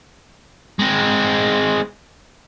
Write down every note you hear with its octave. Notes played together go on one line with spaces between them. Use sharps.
G#3 C4